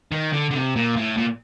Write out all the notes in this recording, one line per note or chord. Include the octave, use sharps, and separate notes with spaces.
D#3
D3
D3
C3
A#2
A2
A#2